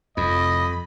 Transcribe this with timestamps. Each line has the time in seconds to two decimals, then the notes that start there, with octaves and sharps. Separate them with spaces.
0.17 F1 C2 F2 D#5 B5